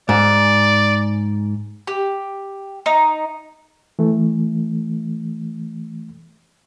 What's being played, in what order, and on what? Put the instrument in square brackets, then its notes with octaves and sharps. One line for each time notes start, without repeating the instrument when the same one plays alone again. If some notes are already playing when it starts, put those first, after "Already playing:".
[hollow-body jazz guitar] G#2 [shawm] D5
[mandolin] G4
D#4
[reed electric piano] E3 A3